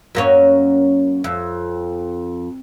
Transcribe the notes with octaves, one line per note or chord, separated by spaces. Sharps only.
F#2 A#3 C#4
F2